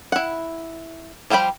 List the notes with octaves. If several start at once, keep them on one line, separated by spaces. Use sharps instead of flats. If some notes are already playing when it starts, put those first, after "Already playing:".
E4 F#5
F3 G3 C5 G5 B5